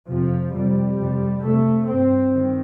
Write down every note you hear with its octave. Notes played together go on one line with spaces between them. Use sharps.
F2 C3 F3
F2 C3 G3
F2 C3
F2 C3 A3
G2 C4
G2 D#3